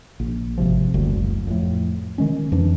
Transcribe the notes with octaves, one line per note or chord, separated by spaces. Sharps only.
A#1
G#1 C3 F3
F#1 D2 G3
F2 A2
D#3 G#3 C#4
F2 E3 D4